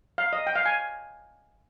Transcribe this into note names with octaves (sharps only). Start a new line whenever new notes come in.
F5
D#5
G5
F5
G#5